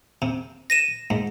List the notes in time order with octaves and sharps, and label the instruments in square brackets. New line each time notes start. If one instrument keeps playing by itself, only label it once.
[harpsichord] C3
[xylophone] A#6 D#7 E7
[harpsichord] G#2